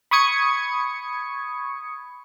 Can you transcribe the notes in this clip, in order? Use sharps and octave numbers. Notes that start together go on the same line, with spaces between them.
B5 C#6 D#6 G#6 C#7